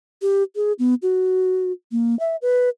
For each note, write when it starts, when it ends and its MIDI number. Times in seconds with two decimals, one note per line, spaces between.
0.22 0.43 67
0.56 0.73 68
0.79 0.94 59
1.02 1.72 66
1.92 2.18 58
2.20 2.36 76
2.42 2.69 71